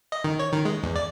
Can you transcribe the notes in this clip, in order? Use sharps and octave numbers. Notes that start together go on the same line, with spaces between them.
D#5
D#3
C#5
D#3
G#3
E2
D5